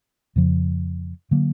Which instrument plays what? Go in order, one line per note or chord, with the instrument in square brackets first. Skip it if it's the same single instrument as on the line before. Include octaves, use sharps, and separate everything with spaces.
[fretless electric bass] F2 C#3 F3
D3 F#3 A#3